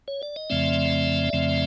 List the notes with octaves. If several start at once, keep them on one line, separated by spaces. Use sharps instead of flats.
C#5
D5
D#5
F2 C#3 F3 A3 C4 D5 E5
F2 C#3 F3 A3 C4